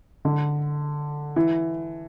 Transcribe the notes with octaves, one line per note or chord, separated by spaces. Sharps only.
D3
E3